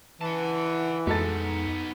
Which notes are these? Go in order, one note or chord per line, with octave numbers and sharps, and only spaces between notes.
E3 F#5 A5
F2 G#3 B3 D#4 A4 A6